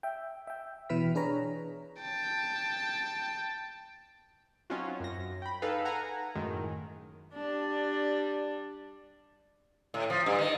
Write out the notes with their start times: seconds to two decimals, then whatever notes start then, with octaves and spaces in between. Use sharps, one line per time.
0.03 E5 G5
0.47 E5 G5
0.89 B2 E3 E4 B4 F6 B6
1.15 D4 G#4 B4 C#5 A#5
2.02 G5 A5
4.70 F#3 C4 C#4 D#4 F4 F#4
5.00 F#2 A#6
5.42 G5 B5
5.62 D#4 G#4 A4 B4 F5
5.85 F#5 G#5 A#5
6.35 F#2 A2 D#3 G#3
7.34 G3 D4
9.94 A2
10.10 F3
10.26 G2
10.38 D#3